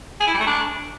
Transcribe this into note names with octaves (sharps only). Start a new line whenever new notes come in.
G#4
E4
G3
A3
D4